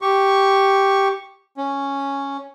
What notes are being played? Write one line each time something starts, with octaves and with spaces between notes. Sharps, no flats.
G4 C#6
C#4